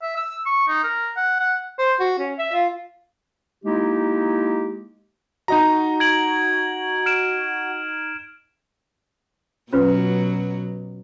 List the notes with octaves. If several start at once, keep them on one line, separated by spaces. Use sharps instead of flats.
E5
E6
C#6
D#4
A#4
F#5
F#5
C5
F#4
C#4
E5
F4
G#3 A#3 D#4 E4 G4
D#4 F#4 D#5 A#5
G#6 D7 F#7
F6 D7 E7
B2 F#3 C#4 F4 B4